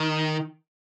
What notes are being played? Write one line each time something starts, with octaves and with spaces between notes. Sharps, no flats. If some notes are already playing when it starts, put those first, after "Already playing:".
Already playing: D#3